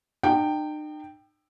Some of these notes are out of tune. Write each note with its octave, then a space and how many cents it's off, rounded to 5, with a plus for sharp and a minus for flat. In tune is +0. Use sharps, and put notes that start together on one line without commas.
D#4 -45 G5 +0